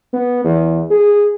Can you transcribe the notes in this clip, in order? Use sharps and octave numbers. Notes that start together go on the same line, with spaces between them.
B3
E2
G#4